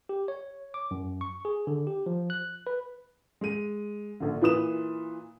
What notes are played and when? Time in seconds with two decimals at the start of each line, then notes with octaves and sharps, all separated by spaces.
0.09 G4
0.28 C#5
0.74 D6
0.91 F#2
1.21 C#6
1.45 G#4
1.67 D3
1.87 G4
2.06 F3
2.30 F#6
2.67 B4
3.41 G#3 D#7
4.20 A#1 D3
4.41 A#2 E3 B4 D#6 E7